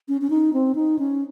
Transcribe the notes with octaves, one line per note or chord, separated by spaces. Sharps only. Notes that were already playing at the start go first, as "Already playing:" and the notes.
C#4
C#4
D#4
C4
D#4
C#4